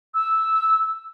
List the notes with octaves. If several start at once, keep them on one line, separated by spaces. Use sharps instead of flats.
E6